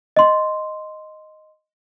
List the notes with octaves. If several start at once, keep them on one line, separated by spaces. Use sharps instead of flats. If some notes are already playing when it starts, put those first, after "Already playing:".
D#5 C6